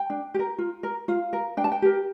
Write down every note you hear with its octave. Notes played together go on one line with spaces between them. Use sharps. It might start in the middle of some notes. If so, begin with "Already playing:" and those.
Already playing: G5
D4
G4
A#4
F4
A#4
F4 F5
A#4
D4 G5
A5
G5
G4 A#4